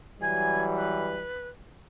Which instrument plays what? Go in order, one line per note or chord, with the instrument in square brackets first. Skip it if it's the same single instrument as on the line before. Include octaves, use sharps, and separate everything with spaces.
[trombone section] E3 F#3 G3 [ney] G#5
[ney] B4